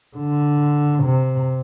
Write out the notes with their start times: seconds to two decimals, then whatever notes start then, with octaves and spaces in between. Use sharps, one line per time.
0.17 D3
1.03 C3